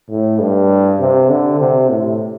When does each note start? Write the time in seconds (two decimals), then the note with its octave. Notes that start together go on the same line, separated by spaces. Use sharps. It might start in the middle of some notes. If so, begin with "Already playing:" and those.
0.10 A2
0.40 G2
1.00 C3
1.30 D3
1.60 C3
1.90 A2